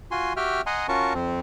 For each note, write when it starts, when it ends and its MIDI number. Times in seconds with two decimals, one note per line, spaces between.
0.11 0.33 65
0.11 0.33 66
0.11 0.33 80
0.11 0.33 84
0.37 0.61 66
0.37 0.61 67
0.37 0.61 76
0.37 0.61 79
0.37 0.61 89
0.66 0.87 75
0.66 0.87 78
0.66 0.87 80
0.66 0.87 82
0.66 0.87 84
0.88 1.13 61
0.88 1.13 65
0.88 1.13 66
0.88 1.13 70
0.88 1.13 81
0.88 1.13 85
1.14 1.40 41
1.14 1.40 60